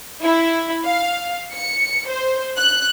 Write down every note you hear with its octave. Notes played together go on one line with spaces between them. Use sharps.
E4
F5
C#7
C5
F#6